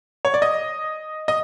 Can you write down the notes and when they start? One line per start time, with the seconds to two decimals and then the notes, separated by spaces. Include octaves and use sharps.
0.25 C#5
0.34 D5
0.42 D#5
1.28 D#5